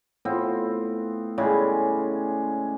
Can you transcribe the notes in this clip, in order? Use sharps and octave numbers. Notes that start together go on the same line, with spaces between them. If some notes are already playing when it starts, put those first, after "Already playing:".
A2 B3 C4 F4
A2 C#3 G3 G#3